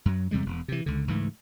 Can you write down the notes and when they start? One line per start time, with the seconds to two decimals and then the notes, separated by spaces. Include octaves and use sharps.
0.05 F#2 F#3
0.31 E2 C3 G3 G#3
0.46 E1
0.68 C3 E3
0.86 C#2 D3
1.07 C#2 G#2 E3 A3